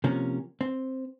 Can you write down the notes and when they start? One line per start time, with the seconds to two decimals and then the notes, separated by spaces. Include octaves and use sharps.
0.04 C3 F3 A#3 C#4
0.61 C4